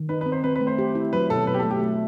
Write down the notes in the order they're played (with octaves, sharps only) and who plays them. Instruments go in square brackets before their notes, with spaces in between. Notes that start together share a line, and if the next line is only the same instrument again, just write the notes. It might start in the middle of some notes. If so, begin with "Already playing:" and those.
Already playing: [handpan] D#3
[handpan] D#4 [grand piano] B4
[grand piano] B4
[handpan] C4
[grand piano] C5
[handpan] C4 [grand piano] B4
[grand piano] B4
[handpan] A3
[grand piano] C5
[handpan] G4
E4
[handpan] F#3 [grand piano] B4
[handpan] B2 [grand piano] A4
[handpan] B2 [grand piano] B4
[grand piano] G4
A4
[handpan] A3
[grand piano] G4
[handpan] A3